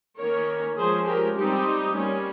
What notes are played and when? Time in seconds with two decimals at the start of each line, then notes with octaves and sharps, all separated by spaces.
0.19 D#3 A#3 C#4 A#4 C#5
0.78 F3 G#3 C#4 G#4 C5
1.07 G4 A#4
1.37 G3 C4 D#4 G4
1.95 G3 A#3 C#4